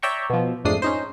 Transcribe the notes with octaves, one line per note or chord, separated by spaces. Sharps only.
C#5 D5 E5 G5 A#5 C#6
B2 F3
F2 G#2 A3 D4 D#6 C7
C#4 D#4 C5